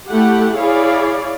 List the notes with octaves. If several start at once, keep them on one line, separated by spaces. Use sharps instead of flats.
A3 E4 G4 F#5
E4 G#4 C#5 D5 F5